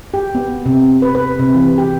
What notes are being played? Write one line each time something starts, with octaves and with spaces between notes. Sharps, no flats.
G4
B3
C3
B4
B4
C3
E3
G4